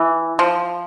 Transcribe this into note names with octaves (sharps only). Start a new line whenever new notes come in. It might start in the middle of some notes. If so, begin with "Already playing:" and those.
Already playing: E3
F3